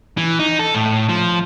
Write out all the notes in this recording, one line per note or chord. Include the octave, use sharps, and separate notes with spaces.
E3
D#4
A4
A2
F3